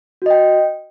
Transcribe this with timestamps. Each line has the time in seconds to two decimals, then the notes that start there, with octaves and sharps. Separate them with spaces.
0.22 F#4
0.26 D#5
0.30 G5